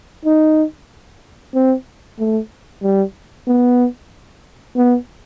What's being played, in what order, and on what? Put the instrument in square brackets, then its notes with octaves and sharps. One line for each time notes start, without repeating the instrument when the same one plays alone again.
[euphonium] D#4
C4
A3
G3
B3
B3